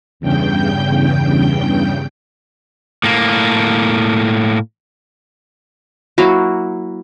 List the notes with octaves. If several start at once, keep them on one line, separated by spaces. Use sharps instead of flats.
E2 G2 C#3 G5 G6
A2 A#3
F#3 A#3 E4 F#4